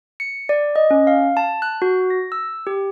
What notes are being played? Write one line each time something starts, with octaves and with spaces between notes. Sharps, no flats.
C#7
D5
D#5
C#4
F5
A5
F#6
F#4
A#6
E6
G4